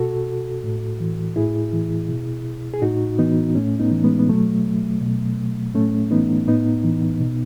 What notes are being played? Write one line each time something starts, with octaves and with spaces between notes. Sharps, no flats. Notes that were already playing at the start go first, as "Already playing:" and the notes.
Already playing: B2 F#4 A4
A2
E3
A2 E4 G#4
E3
B2
G#4
A2 D#4 F#4
E3 B3 D#4
A2 A3 C#4
B3 D#4
E3
G#3 B3
B3
B2 F#3 A3
B2
A2 A3 C#4
E3 B3 D#4
A2 B3 D#4
E3
B2